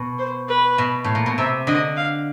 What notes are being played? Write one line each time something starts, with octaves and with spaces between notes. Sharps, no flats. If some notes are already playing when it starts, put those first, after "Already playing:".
Already playing: B2
C5
B4
B2
A2
A#2
B2
C3 E5
D3 D#5
F5